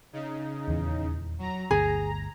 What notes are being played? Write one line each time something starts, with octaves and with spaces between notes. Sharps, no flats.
C#3 D#4
D#1 E2 E3
F#3 A#5
G1 D2 G#4 A#5